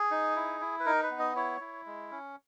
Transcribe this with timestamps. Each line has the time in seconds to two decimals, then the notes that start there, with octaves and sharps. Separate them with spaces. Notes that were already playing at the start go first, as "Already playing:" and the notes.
Already playing: G#4
0.11 D#4
0.36 E4
0.61 E4
0.80 B4
0.86 D#4 A#4
1.03 B4
1.11 B3
1.19 D#5
1.36 E4 C#5
1.61 E4
1.86 G#3
2.11 C#4